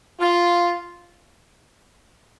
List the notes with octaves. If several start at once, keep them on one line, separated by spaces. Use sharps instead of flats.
F4